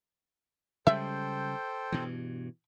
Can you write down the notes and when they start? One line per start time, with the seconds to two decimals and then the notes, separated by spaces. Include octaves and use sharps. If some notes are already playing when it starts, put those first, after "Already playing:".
0.87 C#3 G3 G#3 A4 C5 E5 G5
1.92 G2 B2 E3